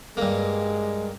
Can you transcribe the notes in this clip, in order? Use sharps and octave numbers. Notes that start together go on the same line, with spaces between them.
G2 G#3 A#3